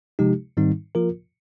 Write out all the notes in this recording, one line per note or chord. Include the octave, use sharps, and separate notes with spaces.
C3 F3 G#3 D#4 G4
G#2 D#3 G3 C4 D#4
F3 A#3 F4 A#4